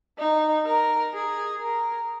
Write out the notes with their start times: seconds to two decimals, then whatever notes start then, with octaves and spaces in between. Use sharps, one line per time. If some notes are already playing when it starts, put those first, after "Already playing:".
0.18 D#4
0.66 A#4
1.14 G#4
1.61 A#4